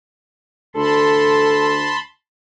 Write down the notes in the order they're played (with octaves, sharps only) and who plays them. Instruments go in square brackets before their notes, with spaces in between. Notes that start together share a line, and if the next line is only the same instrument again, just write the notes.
[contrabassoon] D2 [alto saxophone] A4 [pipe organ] A5 B5 C6